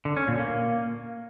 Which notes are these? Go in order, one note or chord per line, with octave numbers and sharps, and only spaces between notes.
D3
C#4
A#2
A#3